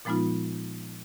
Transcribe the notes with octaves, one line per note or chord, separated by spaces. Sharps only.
A#2 F3 G#3 B3 D#4 F4